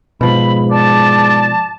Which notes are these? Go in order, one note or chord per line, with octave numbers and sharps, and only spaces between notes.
G#2 B2 F3 B5
D5 A5